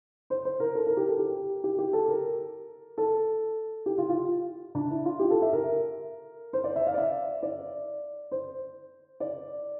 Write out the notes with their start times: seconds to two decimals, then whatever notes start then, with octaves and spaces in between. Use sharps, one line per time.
0.30 C5
0.45 C5
0.60 A#4
0.75 A4
0.87 A#4
0.97 G4
1.08 A4
1.19 G4
1.64 G4
1.78 G4
1.93 A4
2.08 A#4
2.98 A4
3.86 G4
3.98 F4
4.09 F4
4.75 D4
4.90 E4
5.05 F4
5.19 G4
5.30 A4
5.42 E5
5.53 A#4
6.53 C5
6.64 D5
6.76 E5
6.87 F5
6.94 D5
6.98 E5
7.43 D5
8.32 C5
9.20 D5